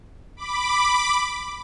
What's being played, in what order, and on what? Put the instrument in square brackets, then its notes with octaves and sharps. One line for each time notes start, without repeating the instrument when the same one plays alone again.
[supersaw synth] B5 D6